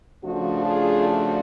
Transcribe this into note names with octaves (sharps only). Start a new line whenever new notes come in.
C#3 F3 A3 D4 F#4
F4 G#4
F#4